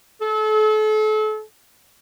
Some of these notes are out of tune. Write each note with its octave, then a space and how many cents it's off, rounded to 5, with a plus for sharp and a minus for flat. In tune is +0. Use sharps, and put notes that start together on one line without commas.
A4 -35